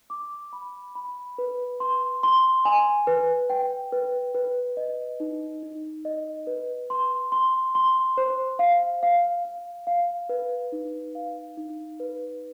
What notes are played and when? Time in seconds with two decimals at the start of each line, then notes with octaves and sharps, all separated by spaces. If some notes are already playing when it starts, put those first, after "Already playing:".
0.10 D6
0.53 B5
0.95 B5
1.38 B4
1.80 C6
2.23 C6
2.65 G#5
3.07 B4
3.50 G5
3.92 B4
4.34 B4
4.77 D#5
5.20 D#4
5.63 D#4
6.05 D#5
6.47 B4
6.90 C6
7.32 C6
7.75 C6
8.17 C5
8.59 F5
9.03 F5
9.45 F5
9.87 F5
10.29 B4
10.72 D#4
11.15 F5
11.57 D#4
12.00 B4